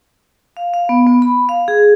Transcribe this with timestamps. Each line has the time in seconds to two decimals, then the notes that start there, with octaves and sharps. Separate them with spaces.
0.57 F5
0.74 F5
0.89 B3
1.06 B3
1.22 B5
1.49 F5
1.68 G#4